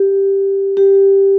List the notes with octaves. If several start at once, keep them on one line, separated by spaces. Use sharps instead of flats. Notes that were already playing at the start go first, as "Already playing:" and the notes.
Already playing: G4
G4